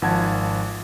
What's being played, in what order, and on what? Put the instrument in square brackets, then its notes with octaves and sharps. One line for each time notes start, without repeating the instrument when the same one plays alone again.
[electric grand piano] G#1 F3 F#5 A5 G#6